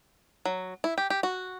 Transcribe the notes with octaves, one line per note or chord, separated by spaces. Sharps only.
F#3
E4
G4
G4
F#4